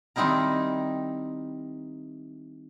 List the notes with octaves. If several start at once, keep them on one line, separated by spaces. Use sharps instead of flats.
D#3 G3 C4 D#4 E4 A#4